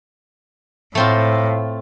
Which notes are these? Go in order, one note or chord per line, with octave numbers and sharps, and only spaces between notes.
A2 A3 C4 F4